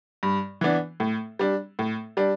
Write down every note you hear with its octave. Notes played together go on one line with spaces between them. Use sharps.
G2
E3 B3 D4
A2
G3 D4
A2
G3 D4